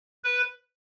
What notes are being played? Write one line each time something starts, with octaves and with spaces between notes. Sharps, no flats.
B4